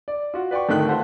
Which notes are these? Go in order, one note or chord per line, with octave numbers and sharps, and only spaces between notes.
D5
F4 F#4
B4 D5 G5 C#6
G#1 D3 D#3 A3 G5 F#6
F4 A4 B4 C5 F#5 A5